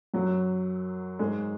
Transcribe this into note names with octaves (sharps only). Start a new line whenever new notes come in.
F#2 F#3
G#2 G#3